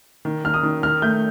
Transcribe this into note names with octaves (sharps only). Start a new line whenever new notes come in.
D#3
D#3 F6
D#6
D#3
D#3 F6
A3 G6